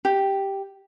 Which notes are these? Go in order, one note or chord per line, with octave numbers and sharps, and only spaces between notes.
G4